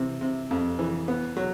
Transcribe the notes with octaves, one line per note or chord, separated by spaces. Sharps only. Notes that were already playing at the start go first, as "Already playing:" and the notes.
Already playing: C3 E3
C3
F2
E3
B3
F#3